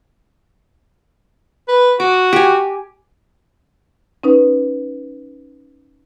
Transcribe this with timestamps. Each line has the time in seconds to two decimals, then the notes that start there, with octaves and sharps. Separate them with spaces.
1.68 B4
2.00 F#4 D6
2.33 G4 G#5
4.23 C#4 D#4 B4